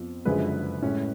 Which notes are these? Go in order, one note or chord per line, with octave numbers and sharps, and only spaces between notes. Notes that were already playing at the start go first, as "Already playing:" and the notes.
Already playing: F2 F3 B3
F#1 F#2 D3 F3 G#3 G#4 B4
A2 G#3 C#4